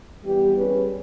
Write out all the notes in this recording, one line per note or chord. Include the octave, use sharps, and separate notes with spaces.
E3 G3 B3 G4
G3 C#4 G#4 B4